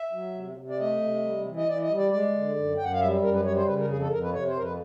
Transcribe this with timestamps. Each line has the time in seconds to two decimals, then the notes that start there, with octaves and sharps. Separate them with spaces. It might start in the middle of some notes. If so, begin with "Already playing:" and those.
Already playing: E5
0.13 F#3
0.35 C3
0.57 C3
0.69 D5
0.79 A3 D#5
1.01 C3
1.23 G3
1.46 E3
1.56 D#5
1.68 E3 D5
1.82 D#5
1.89 G3
1.97 D5
2.12 G#3 D5
2.34 D3
2.56 F#2
2.77 F#2 G5
2.84 F#5
2.93 F5
3.00 G3 E5
3.22 F#2 A#4
3.33 B4
3.45 G3 C#5
3.56 C5
3.66 C#3 B4
3.78 A#4
3.88 F2 G#4
4.00 A4
4.11 F2 A#4
4.22 B4
4.33 C3 C#5
4.48 C5
4.56 F2 A#4
4.63 B4